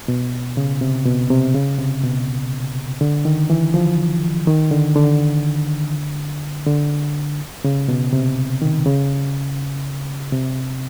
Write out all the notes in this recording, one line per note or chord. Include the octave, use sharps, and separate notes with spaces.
B2
C#3
C3
B2
C3
C#3
C3
B2
D3
D#3
E3
F3
D#3
D3
D3
D3
C#3
B2
C3
D#3
C#3
C3